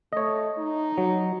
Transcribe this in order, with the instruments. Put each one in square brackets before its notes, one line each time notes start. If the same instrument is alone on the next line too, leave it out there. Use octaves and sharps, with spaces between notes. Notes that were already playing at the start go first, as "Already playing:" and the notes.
[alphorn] A3 [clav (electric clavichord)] C#5 D#5
[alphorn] D#4
[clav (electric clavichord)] F#3